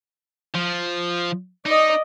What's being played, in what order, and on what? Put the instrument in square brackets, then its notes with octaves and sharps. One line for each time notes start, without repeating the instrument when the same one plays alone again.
[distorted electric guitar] F3
[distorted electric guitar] D#4 [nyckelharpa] D5 D#5